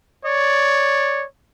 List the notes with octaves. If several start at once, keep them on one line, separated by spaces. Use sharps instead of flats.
C#5 D5